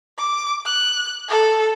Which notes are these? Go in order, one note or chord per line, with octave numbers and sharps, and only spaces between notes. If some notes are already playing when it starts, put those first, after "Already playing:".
D6
F#6
A4